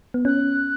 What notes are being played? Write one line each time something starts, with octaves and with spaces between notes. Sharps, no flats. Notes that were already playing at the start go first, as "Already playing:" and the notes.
B3
C#4 F#6